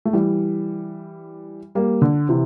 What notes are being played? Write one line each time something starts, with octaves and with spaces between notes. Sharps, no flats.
A3
E3 G3
G3 A#3
D3
C3 E3